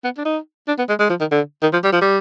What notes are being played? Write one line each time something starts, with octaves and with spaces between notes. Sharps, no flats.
B3
D4
D#4
D4
B3
G#3
G#3
F3
D#3
D3
D#3
F3
G3
F3
G3